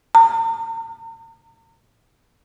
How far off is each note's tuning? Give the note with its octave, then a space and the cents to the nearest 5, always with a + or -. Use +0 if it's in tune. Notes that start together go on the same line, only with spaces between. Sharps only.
A#5 -45